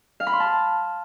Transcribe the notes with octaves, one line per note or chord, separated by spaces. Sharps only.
F5
B5
C6
A5